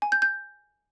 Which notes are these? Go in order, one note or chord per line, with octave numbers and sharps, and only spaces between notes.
G#5
G6
G6